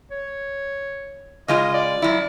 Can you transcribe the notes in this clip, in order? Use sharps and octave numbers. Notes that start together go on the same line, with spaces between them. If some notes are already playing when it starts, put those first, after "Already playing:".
C#5
C#3 G#3 F4 D#5
D5
F#2 E4